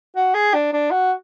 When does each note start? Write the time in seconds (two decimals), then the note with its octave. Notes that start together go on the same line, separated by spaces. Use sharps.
0.16 F#4
0.35 G#4
0.54 D4
0.73 D4
0.91 F#4